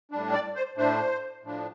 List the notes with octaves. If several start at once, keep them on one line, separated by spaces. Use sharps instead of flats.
A2 G3 D4
D5
C5
A2 A3 D4 C5
A2 F3 D4